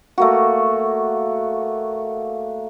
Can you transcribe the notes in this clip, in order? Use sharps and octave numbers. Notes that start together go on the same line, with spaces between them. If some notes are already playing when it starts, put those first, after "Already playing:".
A3 A#3 F#4